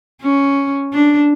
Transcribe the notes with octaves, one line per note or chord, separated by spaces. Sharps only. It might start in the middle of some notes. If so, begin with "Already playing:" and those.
C#4
D4